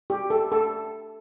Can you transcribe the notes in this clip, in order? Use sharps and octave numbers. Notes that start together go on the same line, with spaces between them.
G4
A4
A4